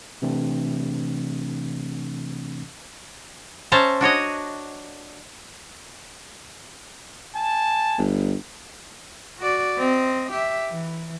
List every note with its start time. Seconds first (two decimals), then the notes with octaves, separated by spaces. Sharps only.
0.22 C3 E3 A3 C4 D4
3.72 C#4 C5 E5 A5 A#5
4.01 D4 F#4 C#5 D#5
7.37 G#5 A5
7.98 G1
9.39 F#4 D5
9.78 C4 D#5
10.32 G4 E5
10.69 E3